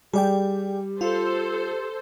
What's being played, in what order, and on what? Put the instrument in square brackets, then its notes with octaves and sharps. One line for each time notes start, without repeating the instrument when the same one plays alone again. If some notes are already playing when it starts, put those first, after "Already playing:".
[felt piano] G3 [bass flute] G4 [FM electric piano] G#4 D5 G5
[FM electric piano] F4 [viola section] A4 C5